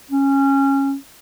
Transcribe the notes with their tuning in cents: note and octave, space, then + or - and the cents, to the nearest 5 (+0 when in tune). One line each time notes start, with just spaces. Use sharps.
C#4 -15